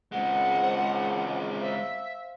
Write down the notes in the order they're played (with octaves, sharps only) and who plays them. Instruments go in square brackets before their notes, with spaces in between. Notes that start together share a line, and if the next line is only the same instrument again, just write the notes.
[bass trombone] C#2 [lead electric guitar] G#3 C4 [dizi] F#5
[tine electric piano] C5 D#5
[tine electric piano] C5 F5 [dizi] E5